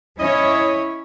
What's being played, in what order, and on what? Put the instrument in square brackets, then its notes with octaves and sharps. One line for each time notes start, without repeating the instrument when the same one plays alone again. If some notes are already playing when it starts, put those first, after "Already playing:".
[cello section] C#4 E4 C#5 [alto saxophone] D#5